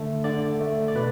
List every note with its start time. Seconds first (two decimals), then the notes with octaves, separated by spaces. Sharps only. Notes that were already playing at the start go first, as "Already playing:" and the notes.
Already playing: D3 A3 A4
0.24 D3 D5
0.60 A3
0.88 D5
0.95 B2 B4